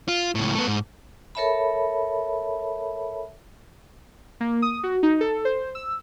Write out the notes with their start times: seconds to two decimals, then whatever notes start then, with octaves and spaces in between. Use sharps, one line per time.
0.08 F4
0.35 C#2 A2
0.55 A3 B3
0.67 G#2
1.35 A4 A#4 C#5 E5 A5 B5
4.40 A#3
4.62 D#6
4.83 F#4
5.03 D#4
5.21 A4
5.45 C5
5.75 E6